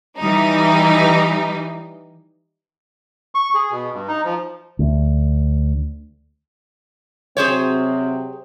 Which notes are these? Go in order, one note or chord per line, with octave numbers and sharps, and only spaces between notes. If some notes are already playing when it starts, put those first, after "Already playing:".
E3 G3 D#4
C#6
G#4
B2
G2
D#4
F3
D2
C3 F#3 C4 G#4 C5 C#5